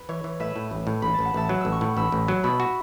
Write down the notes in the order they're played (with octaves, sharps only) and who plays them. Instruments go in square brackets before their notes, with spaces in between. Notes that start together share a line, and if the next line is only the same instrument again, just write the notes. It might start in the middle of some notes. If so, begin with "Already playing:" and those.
Already playing: [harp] B4
[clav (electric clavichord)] E3 [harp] C#5
[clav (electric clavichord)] E3
[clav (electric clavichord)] A2 [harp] B4 E5
[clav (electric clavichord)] A2
A1
A2
[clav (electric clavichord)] A1 [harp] B5
[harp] A5
[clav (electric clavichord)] A1
[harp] F#5
[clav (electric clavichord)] A1 [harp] E5 A5
[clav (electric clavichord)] F#3 [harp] F#6
[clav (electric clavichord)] A1 [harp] E6
[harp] C#6 F#6
[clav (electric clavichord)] A2
[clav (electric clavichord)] A1 [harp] B5 E6
[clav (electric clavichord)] A1
F#3
[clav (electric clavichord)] B2 [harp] B5 E6
[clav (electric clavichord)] F#4